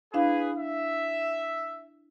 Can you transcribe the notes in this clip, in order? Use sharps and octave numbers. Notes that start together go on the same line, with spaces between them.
D4 E4 G#4 B4 F5
E5